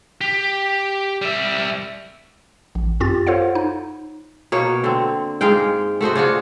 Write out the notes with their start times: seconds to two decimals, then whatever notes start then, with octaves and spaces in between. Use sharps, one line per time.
0.21 G4
1.22 G3 E5
2.75 A1
3.00 F#2 C4 F4 G4 A6
3.27 F4 A4 C5 C#5 F5 F#5
3.55 D#4
4.52 B2 A#3 C#5
4.84 D3 C4
5.41 G#2 G#3 F5 G5
6.01 A3 F#4 C5 D#5
6.15 C#3 D4 F4 F#4